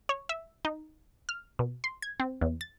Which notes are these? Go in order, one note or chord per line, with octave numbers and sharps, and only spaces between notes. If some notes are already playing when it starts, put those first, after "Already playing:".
C#5
E5
D#4
F6
B2
C6
G#6
C4
E2
A6